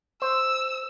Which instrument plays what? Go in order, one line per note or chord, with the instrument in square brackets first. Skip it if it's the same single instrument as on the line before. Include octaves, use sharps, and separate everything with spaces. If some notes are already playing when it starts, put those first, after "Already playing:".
[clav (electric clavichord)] C5 [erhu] E6